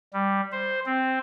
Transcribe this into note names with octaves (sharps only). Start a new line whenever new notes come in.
G3
C5
C4